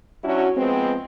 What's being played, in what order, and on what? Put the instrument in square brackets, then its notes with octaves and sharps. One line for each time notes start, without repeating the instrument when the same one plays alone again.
[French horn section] F#3 C#4 D4 E4 F#4
F3 G#3 B3 C4